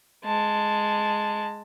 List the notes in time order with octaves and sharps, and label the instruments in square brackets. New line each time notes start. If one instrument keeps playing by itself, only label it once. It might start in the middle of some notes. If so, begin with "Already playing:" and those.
[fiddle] G#3 A5